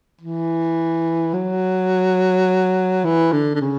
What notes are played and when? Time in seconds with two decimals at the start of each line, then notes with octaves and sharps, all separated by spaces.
0.21 E3
1.34 F#3
3.04 E3
3.32 D3
3.55 D3
3.61 C#3